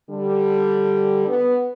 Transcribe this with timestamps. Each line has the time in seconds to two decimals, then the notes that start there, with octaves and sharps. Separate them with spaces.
0.10 D3 G3
1.28 B3